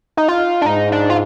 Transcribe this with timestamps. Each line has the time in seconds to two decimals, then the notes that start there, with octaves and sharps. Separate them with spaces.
0.17 D#4
0.28 F4
0.62 D4
0.66 G#2 D#4
0.92 D4
1.10 F4